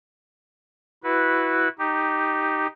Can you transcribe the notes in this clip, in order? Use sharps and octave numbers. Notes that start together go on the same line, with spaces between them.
E4 F#4 B4
D#4 G4